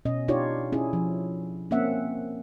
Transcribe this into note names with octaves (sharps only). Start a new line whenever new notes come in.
B2 C#4 D#5
D4 D#4 F4 G4 C#5 D5
C#4 E4 G#4
F3
A#3 C4 C#4 E5 F#5